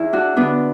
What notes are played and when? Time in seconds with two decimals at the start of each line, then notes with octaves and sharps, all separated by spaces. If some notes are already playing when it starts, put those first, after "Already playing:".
Already playing: E2 E4
0.13 D4 F#4
0.36 D3 B3 D4